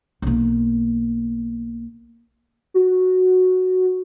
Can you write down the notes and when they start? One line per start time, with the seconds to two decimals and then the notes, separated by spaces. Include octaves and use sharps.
0.22 B1 A#3
2.74 F#4